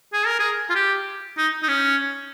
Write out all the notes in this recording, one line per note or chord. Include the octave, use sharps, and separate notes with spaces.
G#4
A#4
G#4
F4
G4
D#4
D#4
C#4